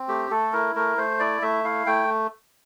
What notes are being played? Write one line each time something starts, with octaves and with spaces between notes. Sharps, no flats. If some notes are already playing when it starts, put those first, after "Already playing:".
Already playing: C4
A3 G4
A3 A4
E4 A#4
A3 A#4
A3 C5
E4 D5
A3 E5
E4 F5
A3 G5